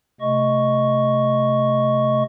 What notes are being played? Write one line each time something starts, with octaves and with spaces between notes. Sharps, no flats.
C3 A3 D#5 C#6